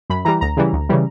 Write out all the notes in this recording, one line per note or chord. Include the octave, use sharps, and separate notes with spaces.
F#2 B5
E3 G3 A#5
D2 A#5
C#3 E3 G3
D2
C#3 E3 G3